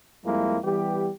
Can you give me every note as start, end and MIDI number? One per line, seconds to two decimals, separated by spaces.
0.25 0.58 41
0.25 0.58 55
0.25 0.58 56
0.25 0.58 58
0.25 0.58 64
0.64 1.11 52
0.64 1.11 55
0.64 1.11 59
0.64 1.11 67